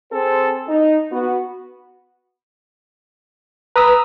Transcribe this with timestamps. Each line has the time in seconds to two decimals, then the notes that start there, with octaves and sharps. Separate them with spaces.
0.12 C4 G#4 A4 C5
0.69 D#4
1.12 B3 F#4
3.76 B4 A#5 D#6 E6